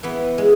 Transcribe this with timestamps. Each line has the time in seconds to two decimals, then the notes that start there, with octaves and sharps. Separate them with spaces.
0.03 E3 B3
0.38 G#3